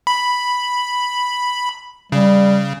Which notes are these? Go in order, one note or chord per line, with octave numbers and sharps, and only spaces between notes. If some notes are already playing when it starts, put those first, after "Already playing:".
B5
C#3 G3